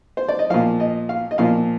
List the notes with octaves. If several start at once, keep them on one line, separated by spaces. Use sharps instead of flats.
C5
D5
D#5
A#2 F3 F5
D#5
F5
D#5
A#2 F3 F5